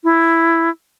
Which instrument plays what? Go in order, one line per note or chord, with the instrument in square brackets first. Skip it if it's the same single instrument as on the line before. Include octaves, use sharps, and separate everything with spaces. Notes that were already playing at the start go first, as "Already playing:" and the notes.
[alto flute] E4